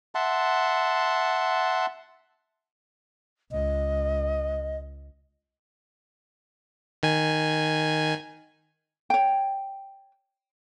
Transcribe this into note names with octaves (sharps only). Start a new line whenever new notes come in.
E5 F#5 A5 C6
C#2 D#5
D#3 G#5
C#5 G5